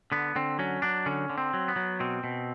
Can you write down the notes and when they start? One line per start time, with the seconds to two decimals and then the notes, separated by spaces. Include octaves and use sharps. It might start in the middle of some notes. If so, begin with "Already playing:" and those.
0.12 D3 B3
0.36 D3 C4
0.59 F#3 C#4
0.82 F#3 D4
1.06 D3 C#4
1.30 D3
1.38 C4
1.54 F#3
1.68 B3
1.76 F#3
2.00 B2 C4
2.24 B2